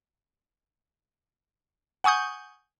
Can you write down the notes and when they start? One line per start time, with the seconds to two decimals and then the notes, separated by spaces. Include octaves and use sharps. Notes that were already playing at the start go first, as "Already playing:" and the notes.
2.04 F#5 G#5 C#6 D#6 G6